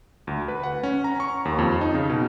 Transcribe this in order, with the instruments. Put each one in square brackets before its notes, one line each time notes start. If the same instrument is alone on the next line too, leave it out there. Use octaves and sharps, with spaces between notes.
[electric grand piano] D2
B4
F#5
C#4
A#5
C#6
D#2
F2
D#4
C#3
B2